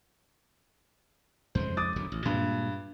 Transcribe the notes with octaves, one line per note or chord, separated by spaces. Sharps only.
F2 C#3 G#3 C5
D6 D#6 A6
F#1 D3 F#3
A1
G2 A#2 G#3